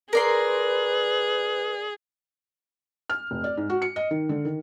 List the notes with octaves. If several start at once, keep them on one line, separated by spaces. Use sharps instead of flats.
G#4 A#4 B4 D5 C6
F6
F1
D5
G#2
F#4
C#7
D#5
D#3
D3
D#3